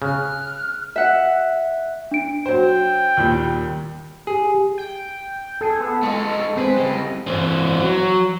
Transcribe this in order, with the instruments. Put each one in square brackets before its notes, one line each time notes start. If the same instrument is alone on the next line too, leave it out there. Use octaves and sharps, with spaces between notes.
[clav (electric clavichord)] C#3 [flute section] F6 F#6
[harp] E5 F#5
[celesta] D4 D7
[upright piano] F#3 C5 [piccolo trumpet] G5
[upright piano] D#2 A#2 G3
[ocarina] G4 [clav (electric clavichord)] G#4
[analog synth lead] G5
[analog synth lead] G#4 [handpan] A4
[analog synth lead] B3
[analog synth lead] G#3 [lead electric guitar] A3 D#4
[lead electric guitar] G#3 G#4 [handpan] C4 [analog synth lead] B4
[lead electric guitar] C#3 G3 [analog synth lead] D#5
[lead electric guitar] E3 C4
F#3